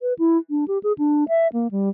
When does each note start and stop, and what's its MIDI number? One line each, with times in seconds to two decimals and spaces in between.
0.01 0.13 71
0.19 0.38 64
0.50 0.65 62
0.68 0.78 67
0.83 0.93 68
0.98 1.24 62
1.28 1.48 76
1.53 1.71 58
1.71 1.90 55